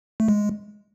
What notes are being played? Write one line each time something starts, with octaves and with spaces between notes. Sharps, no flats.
A3
G#3